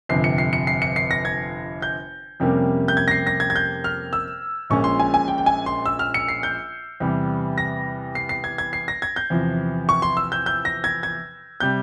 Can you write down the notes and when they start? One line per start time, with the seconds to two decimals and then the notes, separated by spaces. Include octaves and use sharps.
0.09 G1 F2 C3 C7
0.24 C#7
0.38 C7
0.53 C#7
0.67 C7
0.82 C#7
0.96 C7
1.11 A#6
1.25 G#6
1.82 G6
2.40 F2 C3 G3 A#3 C#4
2.88 G6
2.97 G#6
3.08 A#6
3.11 C7
3.27 A#6
3.40 G#6
3.50 G#6
3.56 G6
3.84 F6
4.13 E6
4.70 A#1 A#2 G#3 C#4 C#6
4.84 C6
4.99 G#5
5.14 G#5
5.28 G5
5.38 G5
5.46 G#5
5.66 C6
5.86 E6
5.99 F6
6.14 C#7
6.28 C7
6.43 G6
7.00 E2 C3 G3
7.58 A#6
8.15 C7
8.29 C7
8.44 G#6
8.58 G#6
8.73 C7
8.88 A#6
9.02 G#6
9.16 G6
9.30 E2 C3 F3
9.89 C#6
10.02 C6
10.17 E6
10.32 G6
10.46 G6
10.65 A#6
10.84 G#6
11.03 G#6
11.60 C3 G3 G6